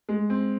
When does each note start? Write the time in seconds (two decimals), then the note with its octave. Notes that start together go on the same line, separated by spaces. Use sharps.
0.09 G#3
0.30 C4